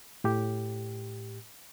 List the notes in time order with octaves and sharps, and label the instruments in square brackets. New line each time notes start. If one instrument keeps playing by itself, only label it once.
[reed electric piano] A2 G4